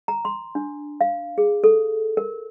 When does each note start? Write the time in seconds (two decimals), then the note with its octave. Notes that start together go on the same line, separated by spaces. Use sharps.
0.08 A#5
0.25 C6
0.55 D4
1.01 F5
1.38 G#4
1.64 A4
2.17 A#4